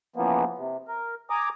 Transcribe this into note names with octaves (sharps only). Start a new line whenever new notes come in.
C#3 E3 F3 A#3 B3
C3
A#4
G#5 A#5 D6 D#6